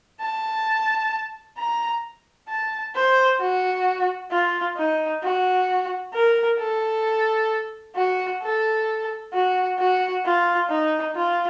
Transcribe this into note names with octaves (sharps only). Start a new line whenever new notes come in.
A5
A#5
A5
C5
F#4
F4
D#4
F#4
A#4
A4
F#4
A4
F#4
F#4
F4
D#4
F4